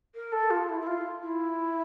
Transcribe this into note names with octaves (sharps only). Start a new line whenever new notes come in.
A#4
A4
F4
E4
E4
F4
E4